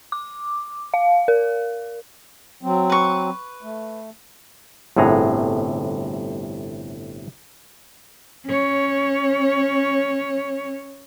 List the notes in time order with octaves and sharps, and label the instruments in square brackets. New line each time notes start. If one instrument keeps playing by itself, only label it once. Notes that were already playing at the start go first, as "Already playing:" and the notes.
[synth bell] D6
F5
A#4
[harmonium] F#3 C4
[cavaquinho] B4 C#6
[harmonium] A3
[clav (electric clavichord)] G1 A2 C3 G#4 F#5 A#5
[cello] C#4 C#5